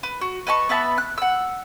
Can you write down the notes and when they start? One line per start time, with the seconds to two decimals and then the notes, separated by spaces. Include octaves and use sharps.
0.03 B4
0.21 F#4
0.47 B4 D#5 A5 C#6
0.69 B3 B4 E5 A5
0.98 F#6
1.18 F#5 E6